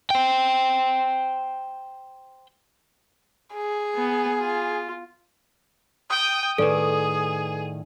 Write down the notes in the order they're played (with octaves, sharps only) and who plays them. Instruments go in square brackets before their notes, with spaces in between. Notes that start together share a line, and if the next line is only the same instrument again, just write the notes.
[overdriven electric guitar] C5 G5
[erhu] G#4
[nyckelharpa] B3
F4
[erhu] G5 [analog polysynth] D#6
[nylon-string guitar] A2 D#3 D5 [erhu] G#4 [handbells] A4 B4